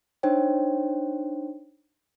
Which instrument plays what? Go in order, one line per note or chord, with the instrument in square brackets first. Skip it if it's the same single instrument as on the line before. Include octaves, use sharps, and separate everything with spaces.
[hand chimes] D4 D#4 C5 C#5 G5